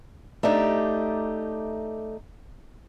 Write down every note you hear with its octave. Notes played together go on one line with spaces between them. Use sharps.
A3 D4 D#4 G4